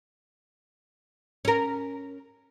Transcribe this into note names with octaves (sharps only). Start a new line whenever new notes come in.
C#4 A#4